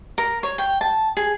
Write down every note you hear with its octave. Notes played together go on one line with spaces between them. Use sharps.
A#4
C#5
G5
A5
G#4